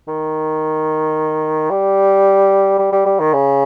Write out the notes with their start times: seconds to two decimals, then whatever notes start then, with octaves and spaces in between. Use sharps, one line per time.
0.07 D#3
1.70 G3
2.79 G3
2.92 G3
3.06 G3
3.19 D#3
3.33 C#3